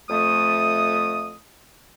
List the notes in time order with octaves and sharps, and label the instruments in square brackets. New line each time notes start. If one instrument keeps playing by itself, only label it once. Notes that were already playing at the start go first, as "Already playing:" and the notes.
[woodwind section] F2 A3 D#6